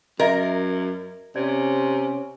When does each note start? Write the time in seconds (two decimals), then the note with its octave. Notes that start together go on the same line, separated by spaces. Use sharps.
0.20 F#2 A#4 D#5 E5
1.36 C3 C#4 D5